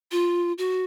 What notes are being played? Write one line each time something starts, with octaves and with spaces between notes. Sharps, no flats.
F4
F#4